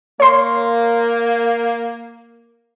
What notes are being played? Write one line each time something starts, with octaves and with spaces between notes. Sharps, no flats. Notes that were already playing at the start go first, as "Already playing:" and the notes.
A#3 C#5 C6